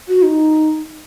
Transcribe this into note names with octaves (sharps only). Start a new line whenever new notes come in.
F#4
D#4